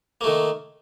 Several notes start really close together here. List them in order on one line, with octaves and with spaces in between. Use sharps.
A#3 A3 D#3